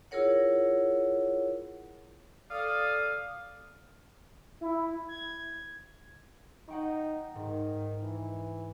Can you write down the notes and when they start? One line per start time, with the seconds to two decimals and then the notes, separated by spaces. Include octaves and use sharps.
0.11 E4 F4 G#4 A#4 C#5 F#5
2.50 A4 D5 F5 D#6
4.61 E4
5.08 G#6
6.68 D#4 F#5 G5 C#6
7.35 G#2 D#3
8.02 E3